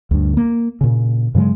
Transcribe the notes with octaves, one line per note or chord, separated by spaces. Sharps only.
D2 G2
A#3
A#2 C#3
G2 C#3 F#3 G#3